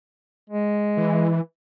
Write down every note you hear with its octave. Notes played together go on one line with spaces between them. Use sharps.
G#3
E3